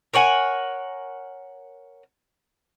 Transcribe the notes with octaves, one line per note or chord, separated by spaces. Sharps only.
A#4 C#5 F#5 G#5